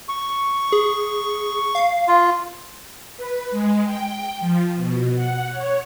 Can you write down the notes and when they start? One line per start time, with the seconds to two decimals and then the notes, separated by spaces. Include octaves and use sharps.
0.09 C#6
0.72 G#4
1.75 F5
2.08 F4
3.17 B4
3.51 G#3
3.84 G5
4.40 F3
4.76 B2
5.16 F#5
5.51 C#5